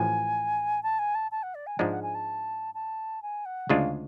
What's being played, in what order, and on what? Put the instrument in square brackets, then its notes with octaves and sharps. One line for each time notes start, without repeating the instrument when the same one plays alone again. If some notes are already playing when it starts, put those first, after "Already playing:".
Already playing: [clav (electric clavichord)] A1 A2 F3 [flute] G#5
[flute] A5
G#5
A5
A5
F#5
D5
G#5
[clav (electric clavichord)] G#2 F3 G#3 D4 [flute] F#5
[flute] F#5
G#5
A5
A5
G#5
F#5
[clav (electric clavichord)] D2 C#3 G#3 D4 F4 [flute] F5